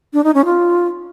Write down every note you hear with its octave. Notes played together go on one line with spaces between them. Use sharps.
D4
D#4
C#4
F4